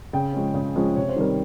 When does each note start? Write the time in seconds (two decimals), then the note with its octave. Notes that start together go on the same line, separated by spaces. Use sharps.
0.13 C#3 G5
0.33 F3 G#3 C#4
0.54 C#3
0.75 F3 G#3 C#4
0.96 C3 C#5
1.09 C5
1.16 D#3 G3 C4 A#4